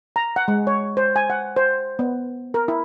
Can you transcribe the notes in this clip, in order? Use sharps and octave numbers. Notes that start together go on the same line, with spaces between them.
A#5
F#5
G#3
C#5
C5
G#5
F#5
C5
B3
A#4
E4